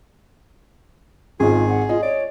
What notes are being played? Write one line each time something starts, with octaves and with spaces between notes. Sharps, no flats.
G#1 G#2 F4 G#4
F#5
F4 D#5
C#5 D5